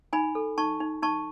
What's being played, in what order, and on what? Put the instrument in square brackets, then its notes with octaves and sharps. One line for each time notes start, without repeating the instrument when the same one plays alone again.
[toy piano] D#4 G#5 B5
A4
D#4 A5 C#6
D#4
D#4 A5 C#6